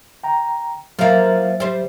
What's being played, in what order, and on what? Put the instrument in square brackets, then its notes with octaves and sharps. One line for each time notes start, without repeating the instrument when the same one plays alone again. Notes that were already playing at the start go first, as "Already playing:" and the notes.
[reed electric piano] G5 A#5
[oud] F3 A#3 [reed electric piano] F#3 E5 A6
[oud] G3 C5